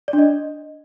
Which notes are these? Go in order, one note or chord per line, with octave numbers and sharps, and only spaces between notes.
D5
D4
D#5